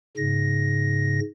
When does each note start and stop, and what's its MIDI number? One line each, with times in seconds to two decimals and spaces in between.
0.17 1.20 44
0.17 1.20 49
0.17 1.20 94